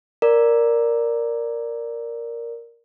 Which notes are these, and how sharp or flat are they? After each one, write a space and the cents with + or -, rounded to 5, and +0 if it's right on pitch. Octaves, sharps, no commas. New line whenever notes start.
A#4 +0 D5 +0